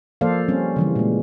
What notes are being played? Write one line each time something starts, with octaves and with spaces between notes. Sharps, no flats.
F3 A#3 A4 C5 D5 F5
G3 C4 C#4
C#3 E3 G3
A#2 G#3